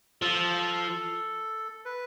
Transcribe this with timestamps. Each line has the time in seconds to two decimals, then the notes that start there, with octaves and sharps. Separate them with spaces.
0.21 F3 A4
1.85 B4